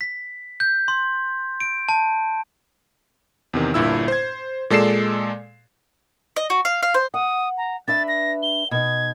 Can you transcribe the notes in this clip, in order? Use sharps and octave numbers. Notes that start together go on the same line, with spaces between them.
B6
G6
C6
D7
A5
E2 C3 D#3
G1 G2 A#2 E4 E6
C5 G#6
A#2 G#3 A4 D5 C7 E7
D#5
F#4
F5
F5
C5
F#5 D#6
A#5
D4 B4 E5 A6
A#6
G7
B2 D#4 G#6